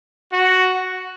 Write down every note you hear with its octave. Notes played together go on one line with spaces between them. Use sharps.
F#4